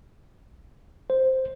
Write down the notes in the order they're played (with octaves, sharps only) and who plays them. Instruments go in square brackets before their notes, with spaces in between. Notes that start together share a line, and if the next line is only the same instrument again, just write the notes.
[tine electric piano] C5